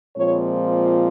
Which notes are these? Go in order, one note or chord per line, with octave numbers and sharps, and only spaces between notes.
A#2 F3 G#3 C4 C#5